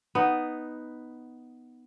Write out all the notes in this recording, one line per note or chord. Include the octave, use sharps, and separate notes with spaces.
B3 D#4